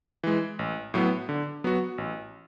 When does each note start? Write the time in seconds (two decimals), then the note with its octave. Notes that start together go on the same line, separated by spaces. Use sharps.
0.23 E3 G#3
0.59 A1
0.94 A2 F#3 B3
1.29 D3
1.64 F#3 B3 F#4
1.98 A1